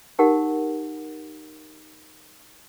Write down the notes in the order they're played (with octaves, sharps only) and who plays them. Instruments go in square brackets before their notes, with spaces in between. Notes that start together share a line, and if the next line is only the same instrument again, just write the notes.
[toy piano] D#4 G4 A#4 F#5